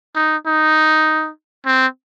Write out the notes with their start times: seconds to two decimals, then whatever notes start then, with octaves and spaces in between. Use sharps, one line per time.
0.16 D#4
0.47 D#4
1.66 C4